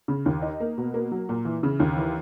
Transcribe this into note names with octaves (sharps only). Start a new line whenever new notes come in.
C#3
D#2
D#4
A#3
B2
A#3
F#3
A#2
E3
C#3
D#2
E3